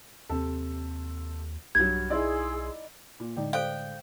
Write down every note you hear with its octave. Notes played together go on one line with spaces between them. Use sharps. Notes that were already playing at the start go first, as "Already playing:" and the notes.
D#2 C3 A4
B1 G2 F#3 G#6
D#4 E4 G#4 D5 C6 E6
A#2
A2 D3 G#3 D#4 D5 G5
A4 C5 D5 F5 G5